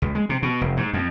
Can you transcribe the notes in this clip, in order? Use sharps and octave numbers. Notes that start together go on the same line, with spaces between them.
C#2
G#3
C3
B2
F1
G#2
F2